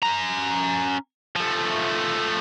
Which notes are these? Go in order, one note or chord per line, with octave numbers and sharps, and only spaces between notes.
C#4 A#5
F3 A3